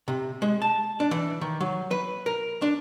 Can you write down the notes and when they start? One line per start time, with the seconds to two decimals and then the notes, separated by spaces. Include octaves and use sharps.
0.08 C3
0.42 G#3
0.62 A5
1.00 D4
1.11 E3
1.41 D#3
1.61 F#3
1.91 B4
2.26 A#4
2.62 D4